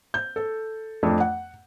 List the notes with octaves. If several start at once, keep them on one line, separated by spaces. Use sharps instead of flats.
G6
A4
F2 A3 D4
F#5